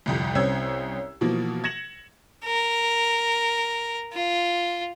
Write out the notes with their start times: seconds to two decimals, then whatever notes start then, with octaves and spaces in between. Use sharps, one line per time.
0.06 G1 C2 F2
0.35 C2 C4 C#4 E6 G#6
1.21 B2 E3 F3 A#3
1.64 G#6 A#6 C#7 E7 F#7
2.45 A#4
4.13 F4